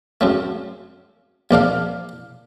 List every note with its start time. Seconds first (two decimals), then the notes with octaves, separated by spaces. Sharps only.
0.21 F#2 C#3 A3
1.51 A#1 A#3 D4 F5